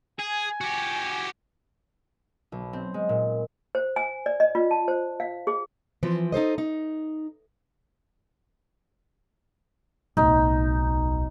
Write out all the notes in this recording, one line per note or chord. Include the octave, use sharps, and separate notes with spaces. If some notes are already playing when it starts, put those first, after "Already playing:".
G#4 G#5
F#4 G4
B1
C4
G#3
A#2
C5
G#5
D5
D#5
F4
A5
C5
F5
G#4
E3 F3 C4
D#4 A4 C5 D#5
D#4
D1 B1 D#4